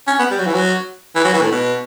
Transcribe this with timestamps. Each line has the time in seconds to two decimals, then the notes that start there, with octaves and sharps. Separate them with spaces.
0.08 C#4
0.19 B3
0.31 G3
0.39 F#3
0.47 E3
0.55 F#3
1.16 E3
1.25 F#3
1.34 E3
1.42 A2
1.52 B2